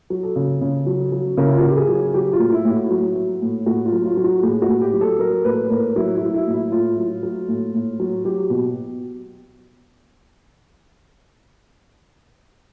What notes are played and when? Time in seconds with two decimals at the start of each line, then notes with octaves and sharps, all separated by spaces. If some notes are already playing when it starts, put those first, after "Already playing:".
0.10 F#3
0.23 A4
0.36 C#3
0.61 C#3
0.86 F#3
1.12 F#3
1.37 C#3 A#4
1.45 E4
1.53 F4
1.60 F#4
1.63 C#3
1.68 G4
1.76 G#4
1.88 F#3
2.14 F#3 G4
2.33 F4
2.39 A2
2.52 E4
2.65 A2
2.71 F#4
2.90 F#3
3.16 F#3
3.42 A2
3.66 A2 F#4
3.86 F4
3.92 F#3
4.05 F4
4.17 F#3
4.24 F#4
4.43 A2 G#4
4.62 F#4
4.69 A2
4.81 G4
4.94 F#3
5.01 A4
5.19 F#3 A#4
5.45 A2 B4
5.70 A2 A#4
5.96 F#3 E4
6.15 E4
6.21 F#3
6.34 E4
6.46 A2
6.53 E4
6.72 A2 F4
6.98 F#3
7.23 F#3
7.48 A2
7.74 A2
8.00 F#3
8.25 F#3 G4
8.50 B2